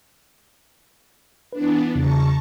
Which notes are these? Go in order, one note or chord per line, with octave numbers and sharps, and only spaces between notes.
E3 B3 D4 B4
E2 C#3 A5 A#5 C#6